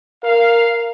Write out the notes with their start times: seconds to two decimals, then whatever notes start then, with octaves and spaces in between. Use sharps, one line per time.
0.23 A#4 F5